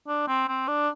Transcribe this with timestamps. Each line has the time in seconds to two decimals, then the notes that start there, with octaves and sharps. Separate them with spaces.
0.08 D4
0.28 C4
0.48 C4
0.68 D4